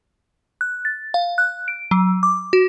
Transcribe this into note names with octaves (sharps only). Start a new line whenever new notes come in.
F#6
A6
F5
F#6
D7
F#3
D6
F#4